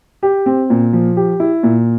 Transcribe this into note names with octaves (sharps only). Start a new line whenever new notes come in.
G4
C4
A#2
F3
G4
E4
A#2